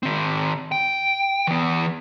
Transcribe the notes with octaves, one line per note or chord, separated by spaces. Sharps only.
D#3 C4
G5
E3 B3